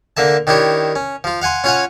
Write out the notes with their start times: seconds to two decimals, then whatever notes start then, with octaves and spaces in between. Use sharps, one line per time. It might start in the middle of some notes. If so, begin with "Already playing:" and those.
0.17 D3 A#3 E5 A5
0.47 D#3 D4 E4 G4 C#5
0.96 C#4
1.24 F3 F4
1.42 F5 F#5 G#5 C6
1.64 C#4 F4 C#5 F5 F#5 G#5